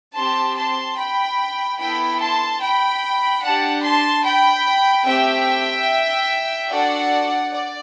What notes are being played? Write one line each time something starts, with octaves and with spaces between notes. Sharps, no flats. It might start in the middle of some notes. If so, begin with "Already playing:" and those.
C4 G4 A5 C6
A5 C6
G5 B5
B3 E4 A4 G5 B5
A5 C6
G5 B5
D4 G4 F#5 A5
A5 C6
G5 B5
A3 C4 G4 E5 G5
D4 F#4 A4 D5 F#5
D5